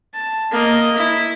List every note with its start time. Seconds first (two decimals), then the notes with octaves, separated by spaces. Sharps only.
0.14 A5
0.51 A#3 D#5
0.97 E4